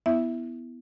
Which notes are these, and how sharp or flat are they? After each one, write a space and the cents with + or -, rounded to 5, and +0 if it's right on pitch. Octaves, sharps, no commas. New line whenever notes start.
B3 +0 E4 +0 E5 +0